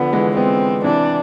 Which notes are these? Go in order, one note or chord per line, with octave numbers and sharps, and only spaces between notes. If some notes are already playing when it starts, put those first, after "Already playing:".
Already playing: D3 F3 B3
E3 G#3
G#3 B3 C4
C3 E3 D4